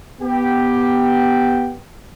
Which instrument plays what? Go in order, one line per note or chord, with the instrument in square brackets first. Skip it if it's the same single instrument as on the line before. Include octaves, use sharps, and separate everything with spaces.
[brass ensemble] B3 G4